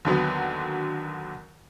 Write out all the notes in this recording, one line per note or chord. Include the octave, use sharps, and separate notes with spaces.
D#2 D3 F#3 B3